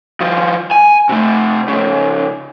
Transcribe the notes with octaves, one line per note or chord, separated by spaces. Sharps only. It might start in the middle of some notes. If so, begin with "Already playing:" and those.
D#3 F3
G#5
C3 A3
C#3 F3